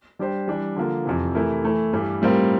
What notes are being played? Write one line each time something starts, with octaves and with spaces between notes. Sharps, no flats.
G3 D4 G4 C5
E3 G3 D4
D3 F3 A#3 F4
F2 C3 E3
C3 E3 A3 E4 A#4
E3 A3 E4
G2 E3 G3
A2 G3 C4 F4 A#4